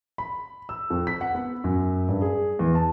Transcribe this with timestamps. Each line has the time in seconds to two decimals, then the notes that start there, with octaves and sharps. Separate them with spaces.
0.18 B5
0.69 E6
0.90 F2
1.07 B6
1.21 F#5
1.35 B3
1.64 F#2
2.08 G2
2.21 G#4
2.59 E2
2.75 A5